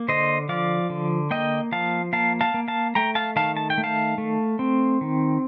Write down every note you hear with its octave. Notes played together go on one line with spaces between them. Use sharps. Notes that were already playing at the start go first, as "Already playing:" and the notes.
Already playing: A#3
D3 C5 D#5
F3 D5 F5
D3
A#3 D#5 G5
F3 F5 A5
A#3 F5 A5
F5 A5
A#3
F5 A5
A3 G5 A#5
F5 A5
D#3 F5 A5
A5
G5
A3
F5 A5
A3
C4
D#3